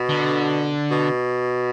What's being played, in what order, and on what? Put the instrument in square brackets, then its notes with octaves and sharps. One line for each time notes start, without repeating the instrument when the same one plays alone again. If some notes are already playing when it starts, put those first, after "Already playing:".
Already playing: [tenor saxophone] B2
[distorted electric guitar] D3
[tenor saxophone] B2